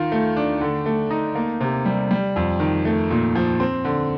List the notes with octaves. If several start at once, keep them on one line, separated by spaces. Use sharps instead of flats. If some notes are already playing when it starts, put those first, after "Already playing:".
Already playing: D#3 F4
A3
D4
D3
A3
D#4
A#3
C3
G3
G3
F2
D#3
A3
A#2
F3
C4
D3